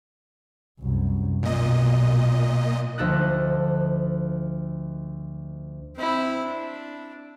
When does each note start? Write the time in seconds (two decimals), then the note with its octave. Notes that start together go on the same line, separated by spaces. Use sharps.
0.80 C2 F#2
1.43 B1 A#2 D#5
2.98 D2 F3 A4 D#5 F#6
5.96 C4 E4
6.45 D4